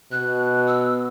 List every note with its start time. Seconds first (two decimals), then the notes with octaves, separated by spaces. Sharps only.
0.12 B2 F#6
0.68 E6